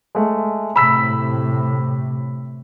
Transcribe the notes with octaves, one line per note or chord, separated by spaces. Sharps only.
G#3 A3
A2 C3 B5 E6 B6